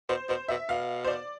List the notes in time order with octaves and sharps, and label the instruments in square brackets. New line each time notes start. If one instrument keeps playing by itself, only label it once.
[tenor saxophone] B2 [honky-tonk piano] C5
[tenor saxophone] B2 [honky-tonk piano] C5
[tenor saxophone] B2 [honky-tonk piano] E5
[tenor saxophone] B2 [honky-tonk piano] F5
[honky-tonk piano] C5
D5